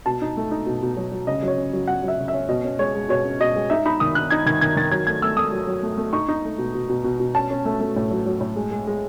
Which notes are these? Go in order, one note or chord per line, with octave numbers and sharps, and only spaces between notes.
B2 A5
D#4
A3
D#4
B2
B2
F#3
F#3
C#3 D#5
F#3
C#5
C#4
F#3
F#3 F#5
F#3 E5
C#3
E5
C#4
B2 D#5
C#4
G#3 C#5
G#3
B2 C#5
C#4
B2 D#5
G#3
D#4 E5
D#4 B5
D#3 D#6
D#4 F#6
D#4 G#6
D#3 G#6
D#3 G#6
D#3 A6
F#3 G#6
A3 G#6
A3 E6
A3 D#6
F#3
F#3
A3
A3
D#4 C#6
D#4
A3
B2
B2
B2
B2
B2
C#4 A5
C#4
A3
A3
A2
F#3
F#3
A2
G#3
G#3
G#3